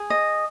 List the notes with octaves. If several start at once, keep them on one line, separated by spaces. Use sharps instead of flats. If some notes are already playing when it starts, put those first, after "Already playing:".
Already playing: G#4
D#5